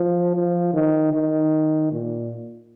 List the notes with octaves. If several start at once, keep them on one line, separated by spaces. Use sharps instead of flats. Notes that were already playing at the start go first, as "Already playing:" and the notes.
Already playing: F3
F3
D#3
D#3
A#2